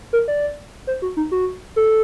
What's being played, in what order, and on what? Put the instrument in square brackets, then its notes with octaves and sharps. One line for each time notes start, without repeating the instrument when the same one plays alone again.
[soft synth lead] A#4
D5
C5
F#4
D#4
F#4
A4